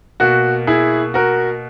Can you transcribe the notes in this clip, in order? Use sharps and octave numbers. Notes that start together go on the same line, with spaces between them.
B2 A#3 F#4
E4 G#4
F#4 A#4